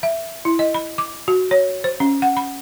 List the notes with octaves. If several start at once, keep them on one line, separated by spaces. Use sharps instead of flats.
E5
E4
D#5
B5
D6
F#4
C#5
C5
C#4
F#5
B5